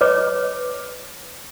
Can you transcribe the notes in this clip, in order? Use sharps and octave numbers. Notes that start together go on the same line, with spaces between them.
B4 C#5 D6